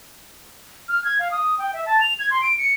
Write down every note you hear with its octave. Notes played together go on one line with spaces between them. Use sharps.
F6
G#6
F5
D#6
G5
E5
A5
F7
G#6
C6
D7
C#7